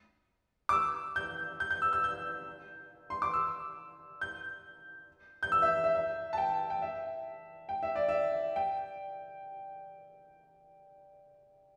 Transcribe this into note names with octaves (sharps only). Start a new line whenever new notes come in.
D6
E6
G6
G6
G6
E6
E6
G6
C6
D6
E6
G6
G6
E6
E5
E5
E5
A5
G5
G5
E5
G5
E5
D5
E5
G5